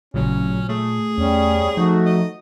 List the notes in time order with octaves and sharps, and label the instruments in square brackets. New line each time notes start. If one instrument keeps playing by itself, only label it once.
[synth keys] A1 C#3 F#3 [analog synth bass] A#2 [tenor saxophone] C#4
[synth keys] A3 [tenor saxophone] G#4
[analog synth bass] E2 [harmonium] G3 C#4
[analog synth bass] F3 [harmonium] A3 F#4 [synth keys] D#4
[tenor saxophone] D#5